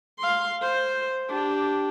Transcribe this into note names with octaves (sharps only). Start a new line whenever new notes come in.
F5 C6
C5
D4 G4